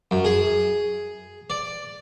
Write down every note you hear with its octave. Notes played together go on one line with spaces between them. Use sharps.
F#2
G#4
D5